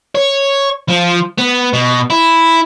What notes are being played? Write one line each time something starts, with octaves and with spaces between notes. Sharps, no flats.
C#5
F3
B3
B2
E4